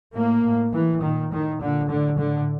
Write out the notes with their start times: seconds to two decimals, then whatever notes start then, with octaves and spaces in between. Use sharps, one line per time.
0.15 A2 A#3
0.44 A2
0.72 A2 E3
1.02 A#2 D#3
1.30 A2 D#3
1.60 A#2 D3
1.88 A2 D3
2.17 A2 D3